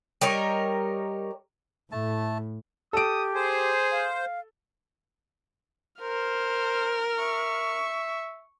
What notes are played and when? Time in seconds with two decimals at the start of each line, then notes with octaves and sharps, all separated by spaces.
0.21 G3 A#4 C#5 D#5
1.92 A2 A3 A5
2.93 G4 A4 D#6 D7
3.35 G#4 C5
3.92 F5
6.02 A#4 C5 F6
7.19 E5 C#6